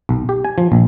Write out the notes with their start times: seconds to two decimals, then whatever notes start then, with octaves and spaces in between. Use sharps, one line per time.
0.09 B1
0.29 G4
0.45 G#5
0.58 F3
0.72 A#1